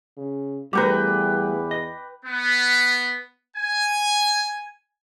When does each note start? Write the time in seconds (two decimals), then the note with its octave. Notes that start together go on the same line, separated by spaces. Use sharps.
0.17 C#3
0.73 E2 G3 A3 A#4 B4 G5 D6
1.71 D#5
2.25 B3
3.56 G#5